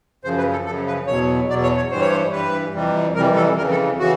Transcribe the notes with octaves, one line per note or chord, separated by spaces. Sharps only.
F#2 C#3 F3 C5
B4
A4
F#2 C#3 F3 A4
B4
E2 B2 F#3 C#5
E2 B2 F#3 D5
C#5
C#5
G2 E3 G3 C5
C#5
C5
G2 E3 G3 B4
F2 C3 E3 G3
F2 C3 E3 G3 A#4
A4
F2 C#3 E3 A#4
A4
C#3 E3 F#4